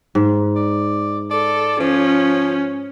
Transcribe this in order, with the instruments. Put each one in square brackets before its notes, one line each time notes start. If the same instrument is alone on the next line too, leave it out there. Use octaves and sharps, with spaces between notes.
[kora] G#2
[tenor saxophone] D5
[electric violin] A4 [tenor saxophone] D5
[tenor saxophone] F3 [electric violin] C#4